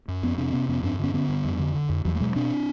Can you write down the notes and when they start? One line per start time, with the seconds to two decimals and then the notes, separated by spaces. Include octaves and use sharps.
0.08 F#2
0.23 F2 B3 C#4
0.38 C3 C4 D4
0.53 C3 B3 C#4
0.69 F2 B3 C#4
0.83 G2 C4 D4
0.99 D3 B3 C#4
1.14 D3 B3 C#4
1.29 G2
1.45 F2
1.59 D3
1.75 D3
1.89 F2
2.05 E2 E3 F#3
2.15 A3
2.20 B2 F#3 G#3
2.35 B2 C4 D4